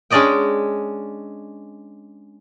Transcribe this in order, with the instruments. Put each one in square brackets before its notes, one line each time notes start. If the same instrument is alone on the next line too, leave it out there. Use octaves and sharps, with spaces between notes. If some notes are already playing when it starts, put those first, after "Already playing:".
[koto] G#3 C#4 D4 D5 D#5 G5